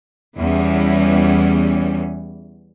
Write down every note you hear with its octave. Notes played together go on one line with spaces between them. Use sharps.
E2 E3 G3 C#4